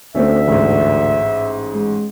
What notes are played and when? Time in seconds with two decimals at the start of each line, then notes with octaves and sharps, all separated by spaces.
0.15 D2 A3 C4 C#4 E5
0.48 A1 G#2
1.74 G#3